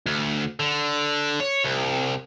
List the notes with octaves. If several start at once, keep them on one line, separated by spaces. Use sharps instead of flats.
D2
D3
C#5
C2